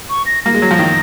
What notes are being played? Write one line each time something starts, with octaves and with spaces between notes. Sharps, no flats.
C#6
A#6
A#3 A#6
G#3
F#3
F3
D#3